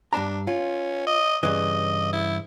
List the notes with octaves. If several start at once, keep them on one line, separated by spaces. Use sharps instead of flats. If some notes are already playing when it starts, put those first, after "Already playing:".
G2 D4 A5 A#5
C#4 F4
D#5
G2 C#3 E3 D#5
E4